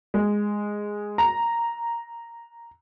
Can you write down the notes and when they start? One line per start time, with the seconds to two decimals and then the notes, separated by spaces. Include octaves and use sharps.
0.14 G#3
1.18 A#5